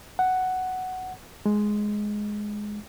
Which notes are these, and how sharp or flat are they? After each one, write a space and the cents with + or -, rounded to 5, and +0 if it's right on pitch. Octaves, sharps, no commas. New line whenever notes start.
F#5 +5
G#3 +5